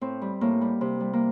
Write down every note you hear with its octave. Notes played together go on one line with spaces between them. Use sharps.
A2 C4
G3
A2 A#3
G3
C3
G3
A#3